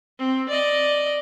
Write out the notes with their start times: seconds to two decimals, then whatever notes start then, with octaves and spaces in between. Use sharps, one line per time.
0.19 C4
0.49 D5 D#5